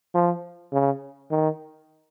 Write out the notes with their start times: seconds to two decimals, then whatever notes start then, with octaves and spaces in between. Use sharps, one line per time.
0.15 F3
0.73 C#3
1.31 D#3